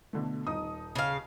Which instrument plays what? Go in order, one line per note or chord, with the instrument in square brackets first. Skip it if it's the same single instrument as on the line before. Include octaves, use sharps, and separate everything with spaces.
[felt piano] B2 D3 A3
D#1 D#4 D#6
[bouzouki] C#3 F5